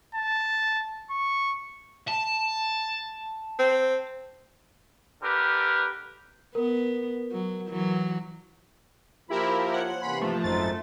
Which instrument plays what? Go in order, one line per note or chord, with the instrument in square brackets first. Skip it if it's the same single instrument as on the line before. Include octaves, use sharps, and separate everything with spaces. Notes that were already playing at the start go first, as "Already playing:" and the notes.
[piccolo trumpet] A5
C#6
[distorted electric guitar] A5
[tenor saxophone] C4
[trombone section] D3 G4 A#4 B4
[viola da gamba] B3 [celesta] A#4
[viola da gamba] F#3
E3 F#3
[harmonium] F3 A#3 F4 [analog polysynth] E4 G4 A#4 [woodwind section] B5
[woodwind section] C5 C#5 [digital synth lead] F#5
[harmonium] C3 E3 A#3 [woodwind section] C#4 C6 [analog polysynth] B5
[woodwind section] G#2 F4 [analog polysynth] F3 [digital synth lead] A3
[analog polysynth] G#1 F#2 A6 [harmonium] D#4 A4 C5